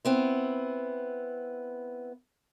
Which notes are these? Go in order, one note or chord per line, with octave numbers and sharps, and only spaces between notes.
B3 C4 E4